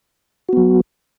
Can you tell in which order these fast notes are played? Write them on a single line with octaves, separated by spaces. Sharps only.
F#4 B3 F#3